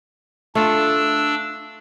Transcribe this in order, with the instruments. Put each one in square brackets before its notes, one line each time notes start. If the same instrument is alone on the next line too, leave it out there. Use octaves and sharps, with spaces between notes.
[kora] A3 F4 [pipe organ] D4 E6